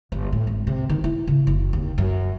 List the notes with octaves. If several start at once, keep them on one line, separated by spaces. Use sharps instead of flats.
G1
A2
G#1
C3
D#3
E4
C#3
F#1
D#2
F#2